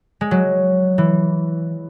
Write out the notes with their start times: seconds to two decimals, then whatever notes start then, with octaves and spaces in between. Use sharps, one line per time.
0.21 G#3
0.31 F#3
0.98 E3